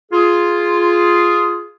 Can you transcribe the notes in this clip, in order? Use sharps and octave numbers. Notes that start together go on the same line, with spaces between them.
F4 G#4